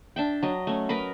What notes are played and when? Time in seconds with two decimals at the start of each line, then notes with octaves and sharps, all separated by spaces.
0.16 D4 E5 G5
0.43 F#3 D#5
0.67 A3 C#4
0.89 A#4 B4 D#5 B5